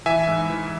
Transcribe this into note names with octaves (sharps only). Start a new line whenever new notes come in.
E3 E5 G#5
G#2
E3